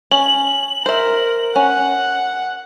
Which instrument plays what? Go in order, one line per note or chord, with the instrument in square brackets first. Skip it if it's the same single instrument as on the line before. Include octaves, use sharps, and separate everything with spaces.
[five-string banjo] C#4 [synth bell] F#7
[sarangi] A#4 [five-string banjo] C5 E5
[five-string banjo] C#4 [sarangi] F#5